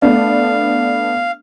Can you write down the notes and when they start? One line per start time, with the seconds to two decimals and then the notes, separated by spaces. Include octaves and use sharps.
0.02 A3 B3 D4 F5